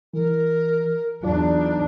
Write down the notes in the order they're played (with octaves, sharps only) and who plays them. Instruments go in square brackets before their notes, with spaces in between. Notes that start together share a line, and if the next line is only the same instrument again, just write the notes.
[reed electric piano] E3 [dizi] A#4
[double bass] E2 D4 [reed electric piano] F#3 F4 D5 [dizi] D#4